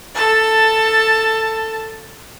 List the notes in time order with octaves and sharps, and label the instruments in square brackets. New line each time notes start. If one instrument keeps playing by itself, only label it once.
[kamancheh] A4 A5